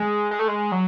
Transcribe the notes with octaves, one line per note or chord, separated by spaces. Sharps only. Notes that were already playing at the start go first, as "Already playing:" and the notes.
Already playing: G#3
G#3
A3
G#3
F#3